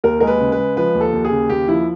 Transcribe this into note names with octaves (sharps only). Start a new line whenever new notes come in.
D#2 A#4
G#3 A#4
B4
C#3
B4
G#3
F3 B4
D#2
A4
D#2
G#4
C#3
D#2 G4
F3 E4